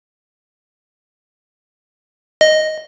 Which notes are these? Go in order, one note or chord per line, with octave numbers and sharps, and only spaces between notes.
D#5